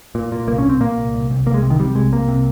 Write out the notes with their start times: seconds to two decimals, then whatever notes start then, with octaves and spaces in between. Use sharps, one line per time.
0.15 A#2
0.32 A#2
0.47 C2 A#3
0.58 C#4
0.64 A#2
0.69 C4
0.80 A#2 A#3
0.97 C2
1.14 C2
1.30 C2
1.46 C2 A#3
1.54 G#3
1.62 C3
1.70 D#3
1.79 C3 G3
1.95 C2 G#3
2.12 C2 A#3
2.28 C3